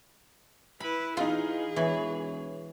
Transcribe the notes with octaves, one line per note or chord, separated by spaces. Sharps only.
E4 B4 B5
E3 D#4 F4 G#4 D#5 F5
E1 E3 C#5